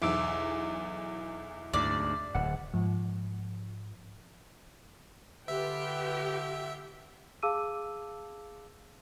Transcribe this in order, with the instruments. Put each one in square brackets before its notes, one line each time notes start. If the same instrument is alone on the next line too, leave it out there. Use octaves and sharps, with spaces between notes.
[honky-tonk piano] B1 E2 [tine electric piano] E5 D6 E6
[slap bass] D2 G#2 [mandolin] D5
[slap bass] D1 [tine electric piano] F#5
[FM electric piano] G#2 F3
[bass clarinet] D3 [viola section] F4 G4 G5 [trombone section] B4 [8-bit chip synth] E5
[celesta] G#4 F5 A5 D6 E6 D#7